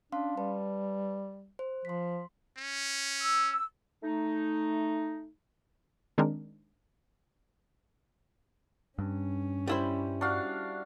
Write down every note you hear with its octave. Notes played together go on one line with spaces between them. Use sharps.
C#4 D4 F5 C6
G3 B4 A5
C5
F3 C6 B6
C#4
E6
A3 D#4
D#3 G#3 C4 D4 D#4 A#4
G2 C#4
G3 E4 C5
D4 F#4 F5